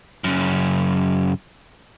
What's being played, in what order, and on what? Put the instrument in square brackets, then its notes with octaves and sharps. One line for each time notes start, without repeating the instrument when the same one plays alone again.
[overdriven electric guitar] F#2 C#3